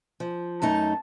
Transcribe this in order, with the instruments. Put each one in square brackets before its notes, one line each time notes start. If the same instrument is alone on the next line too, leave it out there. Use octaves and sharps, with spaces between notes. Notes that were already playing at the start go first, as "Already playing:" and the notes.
[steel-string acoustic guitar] F3
[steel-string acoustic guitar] F#2 A3 D#4 [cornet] A5